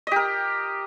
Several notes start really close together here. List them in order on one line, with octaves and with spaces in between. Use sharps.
D#5 G4 A#4